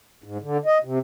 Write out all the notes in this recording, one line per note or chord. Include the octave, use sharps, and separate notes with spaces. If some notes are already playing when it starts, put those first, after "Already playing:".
G#2
D3
D#5
C3